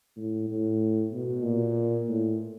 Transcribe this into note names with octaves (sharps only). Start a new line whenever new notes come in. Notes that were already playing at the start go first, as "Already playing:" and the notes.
A2
A2
B2
A#2
A2